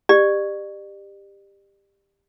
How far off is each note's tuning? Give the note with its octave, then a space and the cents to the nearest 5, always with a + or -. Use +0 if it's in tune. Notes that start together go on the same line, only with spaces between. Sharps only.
G4 +15 D5 +40